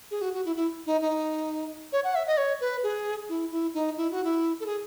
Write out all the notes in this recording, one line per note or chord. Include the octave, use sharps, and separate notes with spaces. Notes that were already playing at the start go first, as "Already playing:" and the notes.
G#4
F#4
F#4
E4
E4
D#4
D#4
C#5
F#5
E5
D#5
C#5
B4
G#4
E4
E4
D#4
E4
F#4
E4
A4
G#4